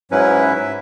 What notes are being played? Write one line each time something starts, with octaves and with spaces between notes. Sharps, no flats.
G#2 F#3 C#4 E4 B4
E5